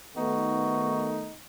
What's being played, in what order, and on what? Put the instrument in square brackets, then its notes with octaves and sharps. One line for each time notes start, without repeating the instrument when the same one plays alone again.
[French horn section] D#3 A3 B3 [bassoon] D#4 [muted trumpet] F#4